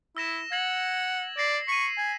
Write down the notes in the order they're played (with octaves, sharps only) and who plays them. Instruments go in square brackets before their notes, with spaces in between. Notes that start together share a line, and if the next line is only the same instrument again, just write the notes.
[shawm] E4 [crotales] E6 A#6 E7
[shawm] F#5 [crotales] G#6 A#6 F#7
[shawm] D5 [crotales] A#6 C7
[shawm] C#6 [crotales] B6 D#7
[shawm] G#5